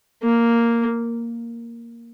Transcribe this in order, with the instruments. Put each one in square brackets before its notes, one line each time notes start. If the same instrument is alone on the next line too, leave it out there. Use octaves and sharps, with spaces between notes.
[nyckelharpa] A#3